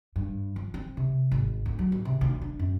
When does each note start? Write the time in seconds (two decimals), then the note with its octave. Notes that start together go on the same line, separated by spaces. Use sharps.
0.16 G2
0.56 F3
0.74 C4
0.97 C3
1.32 G#1
1.66 D2
1.79 F#3
1.92 D1
2.05 C3
2.21 D2
2.42 D4
2.59 F#2